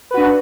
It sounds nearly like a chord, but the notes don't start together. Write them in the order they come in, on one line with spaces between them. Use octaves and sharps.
B4 F#4 D4